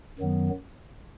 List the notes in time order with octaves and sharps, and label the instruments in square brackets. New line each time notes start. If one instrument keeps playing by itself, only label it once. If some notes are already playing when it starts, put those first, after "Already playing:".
[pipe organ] F#2 D#3 F#3 B3